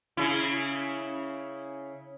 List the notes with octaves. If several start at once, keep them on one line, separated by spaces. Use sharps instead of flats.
C#3 E4